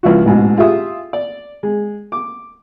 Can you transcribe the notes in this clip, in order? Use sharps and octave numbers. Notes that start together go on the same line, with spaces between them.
C#2 F3 E4 F#4
A1 G#2 B2
F4 G4 G#4 E5 D#6
D5
G#3
D6